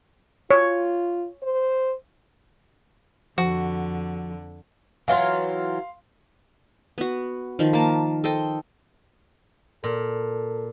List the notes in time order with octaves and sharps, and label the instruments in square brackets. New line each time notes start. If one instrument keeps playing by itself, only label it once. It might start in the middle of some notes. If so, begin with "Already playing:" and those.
[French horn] F4 [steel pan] C#5
[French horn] C5
[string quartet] F2 D3 [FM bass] F3 [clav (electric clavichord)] F#4
[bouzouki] E3 F#3 F4 [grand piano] F5 C6
[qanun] B3 F#4
D#3 F3
A#3 A5
A4 C5 D#5 G5
[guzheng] A#2 [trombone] A4